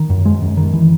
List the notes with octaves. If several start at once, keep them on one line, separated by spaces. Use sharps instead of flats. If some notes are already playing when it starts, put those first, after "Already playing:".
Already playing: D#3
F#2
G#3
F#2
D#3
E3